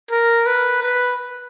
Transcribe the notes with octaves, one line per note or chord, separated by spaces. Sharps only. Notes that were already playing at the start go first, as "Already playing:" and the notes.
A#4
B4
B4